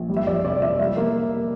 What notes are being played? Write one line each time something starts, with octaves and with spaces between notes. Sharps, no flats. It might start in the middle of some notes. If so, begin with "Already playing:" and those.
Already playing: A#1
G3
E5
F2 D5
C3 D5
F2 E5
G3 E5
A#3